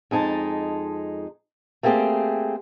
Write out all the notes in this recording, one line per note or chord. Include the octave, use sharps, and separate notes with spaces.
F2 G#3 D#4 A5
A3 A#3 C4 G4 G#4